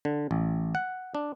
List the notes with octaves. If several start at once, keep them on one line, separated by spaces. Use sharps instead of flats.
D3
A1
F#5
D4